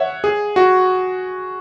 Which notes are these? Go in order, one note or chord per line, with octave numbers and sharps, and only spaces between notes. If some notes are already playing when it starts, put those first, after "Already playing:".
Already playing: C#5 E5 F#5
G#4
F#4